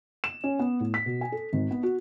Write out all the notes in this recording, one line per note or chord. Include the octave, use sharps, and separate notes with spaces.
E7
C#4
B3
A2
B6
B2
G#5
A4
G#1
B3
F#4